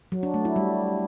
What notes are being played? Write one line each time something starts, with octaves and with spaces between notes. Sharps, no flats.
F#3
D4
A3
E4
G3